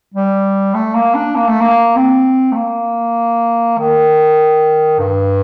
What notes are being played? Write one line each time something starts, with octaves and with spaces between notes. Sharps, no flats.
G3
A3
A#3
D4
A#3
A3
A#3
C4
A3
A#3
D#3
G2